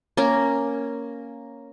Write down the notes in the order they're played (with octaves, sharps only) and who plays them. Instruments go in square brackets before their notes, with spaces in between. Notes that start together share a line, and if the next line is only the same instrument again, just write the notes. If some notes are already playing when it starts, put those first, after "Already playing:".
[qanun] A#3 C#4 A#4